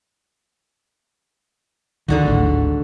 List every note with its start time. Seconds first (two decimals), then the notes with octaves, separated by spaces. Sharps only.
2.08 D#2 G#2 D3 D#3 F#4
2.25 D1 G#1 A2